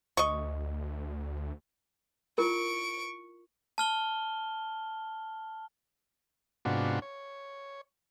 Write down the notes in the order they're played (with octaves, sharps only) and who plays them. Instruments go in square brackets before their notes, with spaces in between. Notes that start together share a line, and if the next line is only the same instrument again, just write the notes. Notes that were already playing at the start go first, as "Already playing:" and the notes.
[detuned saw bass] D2 [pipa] D#5 C#6
[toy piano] E4 F4 A#4 [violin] C#6 D7
[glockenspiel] A5 F6 G7
[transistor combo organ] G#2 C3 B3 D4 F4 F#4
C#5